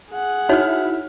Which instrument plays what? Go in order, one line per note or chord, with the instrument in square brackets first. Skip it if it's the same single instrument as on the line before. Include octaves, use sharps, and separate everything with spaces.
[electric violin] G#4 F#5
[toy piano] D#4 F#4 C#5 [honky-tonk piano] E4 F6